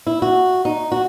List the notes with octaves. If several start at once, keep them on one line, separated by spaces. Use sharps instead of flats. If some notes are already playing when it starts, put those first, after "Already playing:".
E4
F#4
D#4
F#4